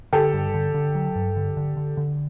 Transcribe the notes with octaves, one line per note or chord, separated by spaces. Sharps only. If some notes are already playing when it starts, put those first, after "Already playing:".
D3 G4 A4
G2
D3
D3
F#3
G2
D3
D3
D3
D3